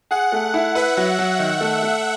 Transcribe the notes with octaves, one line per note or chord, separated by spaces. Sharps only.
G#4 F#5
A3
E4
B4 E5
F#3
F#3
D#3
A3
A3